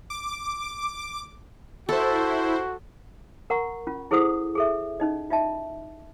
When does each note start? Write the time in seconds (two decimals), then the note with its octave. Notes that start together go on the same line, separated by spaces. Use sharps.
0.10 D6
1.89 E4 F#4 A4 C5
3.50 A#4 F#5 A#5 C#6
3.87 C#4 F4
4.11 E4 G#4 A4 C5 F#5 D#6
4.55 G#4 A4 E5
5.00 C#4 D#4 D#5
5.30 F4 D#5 E5 A5